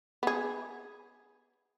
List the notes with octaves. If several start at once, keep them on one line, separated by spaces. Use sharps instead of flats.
B3 G#4